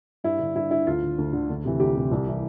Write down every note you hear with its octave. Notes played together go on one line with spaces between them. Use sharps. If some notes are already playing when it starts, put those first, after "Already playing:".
G2 E4
D3
G2 E4
D3 E4
D2 F4
D3
D2
D3
D2
C3 E3
D2 G4
C3 E3
C2
C3 E3